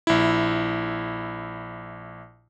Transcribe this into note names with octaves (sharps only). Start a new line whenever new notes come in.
A#1 E4